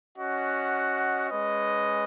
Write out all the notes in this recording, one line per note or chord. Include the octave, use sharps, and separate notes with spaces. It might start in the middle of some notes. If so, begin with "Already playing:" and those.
C#4 F#4 D#5 F#5
G#3 C#4 B4 D#5